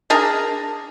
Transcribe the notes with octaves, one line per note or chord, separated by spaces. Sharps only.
D4 G#4 A#4